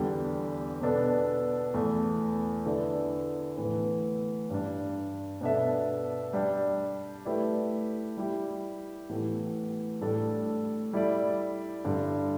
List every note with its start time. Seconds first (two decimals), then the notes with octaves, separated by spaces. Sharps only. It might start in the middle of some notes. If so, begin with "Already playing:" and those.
Already playing: E2 D3 G3 D4 G4
0.81 B2 B3 D4 A4
1.74 E2 E3 A3
2.65 D3 B3 E4 A4 D5
3.57 A2 E3 B3
4.50 G2 G3 D4
5.41 B2 B3 D4 A4 E5
6.33 G3 D4 G4
7.25 A3 E4 G4 B4 D5
8.17 G3 E4 G4
9.09 A2 E3 B3 G4
10.01 A2 G3 D4 A4 D5
10.93 G3 E4 A4 D5
11.85 G2 D3 G3